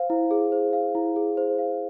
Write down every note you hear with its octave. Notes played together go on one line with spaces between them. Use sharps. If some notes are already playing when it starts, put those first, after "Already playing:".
Already playing: C5 F5
E4
G#4
C5
F5
E4
G#4
C5
F5